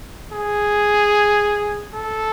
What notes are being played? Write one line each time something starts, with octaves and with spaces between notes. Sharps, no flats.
G#4
A4